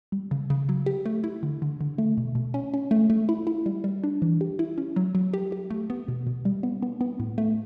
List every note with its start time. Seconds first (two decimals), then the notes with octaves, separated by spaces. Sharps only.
0.12 G3
0.31 C#3
0.50 C#3
0.69 F#3
0.86 G4
1.05 A3
1.24 E4
1.43 D3
1.62 D3
1.81 D3
1.98 A3
2.18 B2
2.35 B2
2.54 C#4
2.74 C#4
2.91 A3
3.10 A3
3.29 E4
3.47 E4
3.66 G3
3.84 G3
4.04 D4
4.22 E3
4.41 G4
4.59 E4
4.78 C#4
4.96 F#3
5.15 F#3
5.33 G4
5.52 G4
5.70 A3
5.90 B3
6.08 B2
6.27 B2
6.45 G3
6.63 B3
6.82 B3
7.01 B3
7.20 A2
7.38 A3